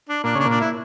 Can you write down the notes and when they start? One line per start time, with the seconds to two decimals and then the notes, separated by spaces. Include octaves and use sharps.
0.09 D4
0.24 A#2 D4
0.35 C#3 D4
0.45 A#2 D4
0.60 E4